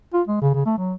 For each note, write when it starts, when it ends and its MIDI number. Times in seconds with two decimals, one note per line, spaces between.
0.14 0.22 65
0.28 0.39 56
0.42 0.50 49
0.54 0.65 49
0.66 0.76 57
0.78 0.94 54